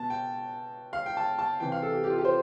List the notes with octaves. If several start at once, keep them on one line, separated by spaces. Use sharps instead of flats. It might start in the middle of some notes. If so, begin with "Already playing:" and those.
Already playing: B2 A5
G5
F5
G5
A5
A5
C3 E3 G5
F5
A4
G4
G4
F4
G4
C5